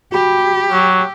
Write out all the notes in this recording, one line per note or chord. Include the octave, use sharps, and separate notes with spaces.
F#4 G4 B5
F#3 E6